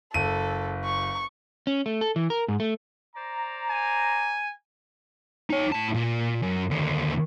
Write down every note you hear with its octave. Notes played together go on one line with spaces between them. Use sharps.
F#1 A4 D#7
C#6
C#4
A3
A4
E3
A#4
G#2
A3
C5 D5 A#5
G#5
D#4 C#5
A2 A5
A#2
F#2
D#2 D3